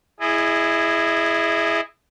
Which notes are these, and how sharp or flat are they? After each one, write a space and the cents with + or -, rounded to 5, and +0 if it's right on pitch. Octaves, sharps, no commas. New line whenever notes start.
E4 +0 G#4 +0 D#5 -30